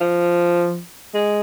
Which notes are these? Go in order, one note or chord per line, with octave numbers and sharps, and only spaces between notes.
F3
G#3